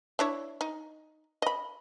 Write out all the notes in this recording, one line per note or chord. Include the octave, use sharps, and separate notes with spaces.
D4 E4 C#5
D#4
D#5 B5